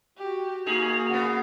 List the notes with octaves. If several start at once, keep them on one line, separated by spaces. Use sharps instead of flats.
F#4 G4
A#3 D#4 F#4 G#4 F7
C#3 B3 F#5